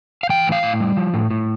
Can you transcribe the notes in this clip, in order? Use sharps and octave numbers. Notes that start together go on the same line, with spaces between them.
F5
E3 G5
A2
F5
A2
G3
F3
A2
A2